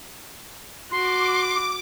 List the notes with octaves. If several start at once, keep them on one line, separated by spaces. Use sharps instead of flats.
F#4 C6 D6